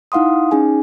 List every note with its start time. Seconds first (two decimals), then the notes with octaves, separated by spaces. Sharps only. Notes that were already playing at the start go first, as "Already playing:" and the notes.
0.12 D#4 E4 F5 F#5 C6 D#6
0.51 C#4 D#4 G#4 G#5